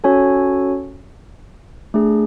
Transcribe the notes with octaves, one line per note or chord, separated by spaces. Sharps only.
C#4 F#4 A4 C#5 G#5
A3 D4 G#4